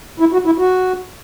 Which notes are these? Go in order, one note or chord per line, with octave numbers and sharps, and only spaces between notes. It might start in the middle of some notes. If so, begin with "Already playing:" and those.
E4
F#4
E4
F#4